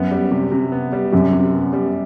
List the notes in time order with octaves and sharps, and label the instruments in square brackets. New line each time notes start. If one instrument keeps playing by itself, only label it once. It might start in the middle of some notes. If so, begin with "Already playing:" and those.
Already playing: [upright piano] F#2 [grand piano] B3
[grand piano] G3
C3
C3
B3
G3
[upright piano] F#2 [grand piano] C3
[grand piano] C3
B3
G3